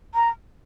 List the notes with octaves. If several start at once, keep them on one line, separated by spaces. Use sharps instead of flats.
A#5